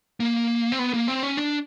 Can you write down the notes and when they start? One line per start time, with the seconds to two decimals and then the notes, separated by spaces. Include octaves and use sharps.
0.20 A#3
0.72 C4
0.79 B3
0.94 A#3
1.08 C4
1.23 C#4
1.37 D4